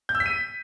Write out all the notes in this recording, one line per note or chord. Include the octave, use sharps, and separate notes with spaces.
G6
E6
B6
D#7